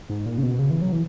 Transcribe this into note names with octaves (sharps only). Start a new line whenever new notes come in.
G#2
A#2
C#3
B2
C#3
E3
F#3
E3